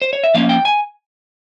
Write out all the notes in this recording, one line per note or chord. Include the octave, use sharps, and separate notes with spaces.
C5
C#5
E5
F3 A#3 C#4 F5
G5
G#5